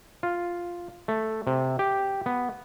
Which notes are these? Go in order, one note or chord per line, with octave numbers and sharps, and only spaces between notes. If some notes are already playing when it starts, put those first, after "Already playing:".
F4
A3
C3
G4
B3